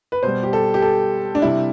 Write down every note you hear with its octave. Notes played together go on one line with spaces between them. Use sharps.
B4
B2 G3 C5
G4
A4
G4
A4
D4
C3 G3 E4